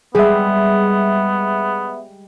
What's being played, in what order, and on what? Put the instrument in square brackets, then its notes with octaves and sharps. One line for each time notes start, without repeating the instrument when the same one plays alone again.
[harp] G3 G#3 [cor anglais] B3 [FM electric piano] G#4 E5